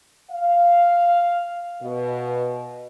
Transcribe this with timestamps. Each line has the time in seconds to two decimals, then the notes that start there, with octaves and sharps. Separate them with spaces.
0.31 F5
1.82 B2